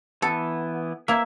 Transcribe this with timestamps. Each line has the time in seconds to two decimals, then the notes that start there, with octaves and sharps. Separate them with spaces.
0.22 E3 B3 A4
1.08 A#3 E4 E5